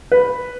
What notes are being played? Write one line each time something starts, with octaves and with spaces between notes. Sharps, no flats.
B4